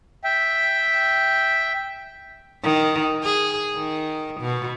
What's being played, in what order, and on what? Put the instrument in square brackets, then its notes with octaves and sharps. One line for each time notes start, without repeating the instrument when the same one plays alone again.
[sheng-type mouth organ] E5 G5
[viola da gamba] D#3
G#4
D#3
B2